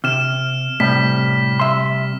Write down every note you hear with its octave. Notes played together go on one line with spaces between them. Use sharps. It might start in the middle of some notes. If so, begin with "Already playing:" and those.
C3 F6 E7
A2 C3 G3 B6
E5 C6